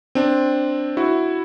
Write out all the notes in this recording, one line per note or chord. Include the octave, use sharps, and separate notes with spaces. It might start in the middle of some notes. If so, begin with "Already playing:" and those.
C4 D4
E4 F#4